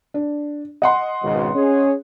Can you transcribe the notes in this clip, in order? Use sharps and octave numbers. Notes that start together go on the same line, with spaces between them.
D4
D#5 F#5 C6
G#1 C#2 B2
C#4 G#4 C#5